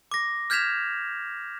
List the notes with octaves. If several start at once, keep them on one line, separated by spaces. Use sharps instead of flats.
D6 A#6
F6 G6 G#6 B6 E7 F7